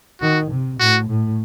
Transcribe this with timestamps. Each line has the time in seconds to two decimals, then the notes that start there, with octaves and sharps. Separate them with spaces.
0.21 D#3 F#4
0.51 C3
0.80 A2 F#4
1.09 A2